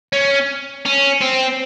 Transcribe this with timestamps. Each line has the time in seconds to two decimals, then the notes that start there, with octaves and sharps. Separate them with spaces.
0.13 C#4
0.85 C#4
1.21 C4